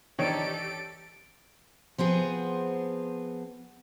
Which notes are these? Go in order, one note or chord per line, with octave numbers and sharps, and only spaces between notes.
D#3 E3 D4 G4 A4 C#5 D7
F3 B3 C4 G#4